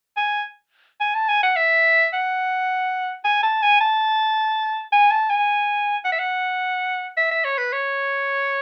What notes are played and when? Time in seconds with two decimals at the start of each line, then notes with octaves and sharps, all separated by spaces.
0.17 G#5
1.01 G#5
1.15 A5
1.28 G#5
1.43 F#5
1.56 E5
2.13 F#5
3.25 G#5
3.43 A5
3.62 G#5
3.81 A5
4.92 G#5
5.11 A5
5.30 G#5
6.05 F#5
6.12 E5
6.19 F#5
7.17 E5
7.31 E5
7.44 C#5
7.58 B4
7.72 C#5